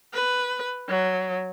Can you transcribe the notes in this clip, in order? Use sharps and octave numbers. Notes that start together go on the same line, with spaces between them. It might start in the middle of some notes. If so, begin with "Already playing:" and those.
B4
F#3